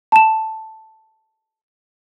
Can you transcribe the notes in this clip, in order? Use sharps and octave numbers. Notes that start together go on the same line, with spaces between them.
A5 E7